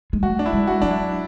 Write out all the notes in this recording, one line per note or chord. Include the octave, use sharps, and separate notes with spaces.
G#3
A3 F#4
D4
E4
G#3
F#4
F#3 D4
E4